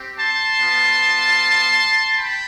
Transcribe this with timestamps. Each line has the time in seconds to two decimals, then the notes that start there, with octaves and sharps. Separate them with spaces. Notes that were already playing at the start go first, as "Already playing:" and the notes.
Already playing: C4 G4
0.19 A5 C6
0.59 B3 F4
2.17 G5 B5